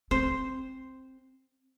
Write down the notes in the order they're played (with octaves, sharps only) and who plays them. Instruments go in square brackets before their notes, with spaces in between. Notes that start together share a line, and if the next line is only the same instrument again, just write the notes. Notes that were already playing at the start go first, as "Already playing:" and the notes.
[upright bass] C4 [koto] C5